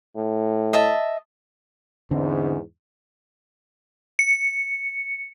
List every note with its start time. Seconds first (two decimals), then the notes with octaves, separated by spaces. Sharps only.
0.16 A2
0.73 D#5 E5 A5
2.11 E2 G#2 D3 C4
4.19 C#7